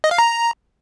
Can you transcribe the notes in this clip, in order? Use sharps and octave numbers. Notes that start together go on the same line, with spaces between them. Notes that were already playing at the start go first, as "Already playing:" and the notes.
D#5
F5
A#5